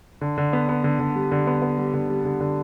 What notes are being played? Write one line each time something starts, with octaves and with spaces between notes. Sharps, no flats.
D3
D3
B3
B3
D3
D3
G3
D3
B3
B3
G3
D3
G3
D3
D3